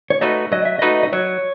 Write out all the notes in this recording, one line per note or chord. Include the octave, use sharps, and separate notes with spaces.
C#5
A3 D#4 F#4 B4 D#5
F#3 D#5
E5
A3 D#4 F#4 B4 D#5
D#5
F#3 C#5